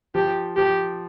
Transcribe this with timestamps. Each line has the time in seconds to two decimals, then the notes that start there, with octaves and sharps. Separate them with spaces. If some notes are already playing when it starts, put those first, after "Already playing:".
0.15 F3 G4
0.57 F3 G4